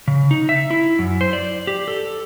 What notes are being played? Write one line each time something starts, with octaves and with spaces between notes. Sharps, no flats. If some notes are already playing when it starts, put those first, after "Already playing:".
C#3
D#4
E5
E4
F#2
C5
D5
G4
A4